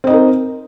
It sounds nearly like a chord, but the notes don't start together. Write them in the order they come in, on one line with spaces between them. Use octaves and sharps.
C4 D#5 D#4 A#4